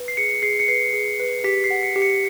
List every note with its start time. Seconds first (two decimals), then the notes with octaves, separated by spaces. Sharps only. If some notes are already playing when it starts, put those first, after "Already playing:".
Already playing: B4
0.08 C7
0.17 G#4 C#7
0.42 G#4 C7
0.59 C#7
0.68 B4 C7
0.93 G#4
1.20 B4
1.44 G4 B6
1.64 C7
1.70 F#5
1.83 C#7
1.96 G4
2.02 C#7